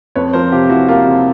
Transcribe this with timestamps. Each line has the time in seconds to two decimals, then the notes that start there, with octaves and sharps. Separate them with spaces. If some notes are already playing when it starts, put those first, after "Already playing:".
0.16 F2 B4 C#5
0.33 F3 A#4 C5
0.51 C3 F4 G4
0.69 F3 E4 F#4
0.88 A#3 F4 G4
1.06 C3